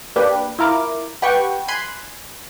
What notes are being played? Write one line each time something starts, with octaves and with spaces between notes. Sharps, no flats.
A#3 D4 G4 B4
E4 F4 A#4 D6
G4 B4 F#5 G5 C#6
G#5 B5 C6 F#6